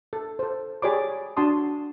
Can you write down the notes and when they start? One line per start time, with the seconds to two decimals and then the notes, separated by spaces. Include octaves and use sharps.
0.13 A4
0.39 A4 C5
0.82 G4 G#4 C#5 D5 B5 D6
1.37 D4 F#4 A5 C6 D#6